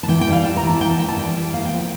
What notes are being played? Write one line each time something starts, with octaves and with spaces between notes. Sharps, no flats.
A5
E3 G5
G5
G3
F5
E3 A5
A#5
E3
A5
A#3 G5
A5
E3 G5
A5
G3 G5
E3
A#3 F5
G5
F3
G5